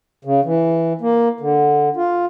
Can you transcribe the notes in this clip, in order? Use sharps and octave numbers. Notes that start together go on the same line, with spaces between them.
C#3
E3
A#3
D3
F4